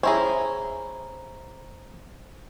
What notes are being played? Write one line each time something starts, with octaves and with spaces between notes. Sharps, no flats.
C#4 E4 G#4 C5 A#5